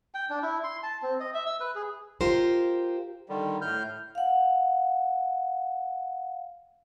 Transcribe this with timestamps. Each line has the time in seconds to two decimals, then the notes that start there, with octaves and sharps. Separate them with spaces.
0.14 G5
0.30 D4
0.43 E4
0.64 C6
0.83 A5
1.02 C4
1.20 D#5
1.34 E5
1.46 E6
1.60 B4
1.75 G#4
2.21 F4 G4 A#4 C5
3.29 D3 D#3 G3
3.62 A2 F6 G6
4.15 F5 F#5